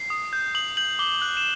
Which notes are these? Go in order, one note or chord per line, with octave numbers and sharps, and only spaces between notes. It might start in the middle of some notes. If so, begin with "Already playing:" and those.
Already playing: C7
D#6
G6
D#6 F#7
G6 F#7
D6 G7
F#6 F#7
E7